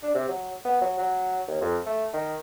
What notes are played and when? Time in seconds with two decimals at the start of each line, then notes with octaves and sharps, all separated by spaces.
0.03 D4
0.15 C3
0.28 F#3
0.65 B3
0.81 F#3
0.99 F#3
1.47 D#2
1.61 F2
1.86 A3
2.14 D#3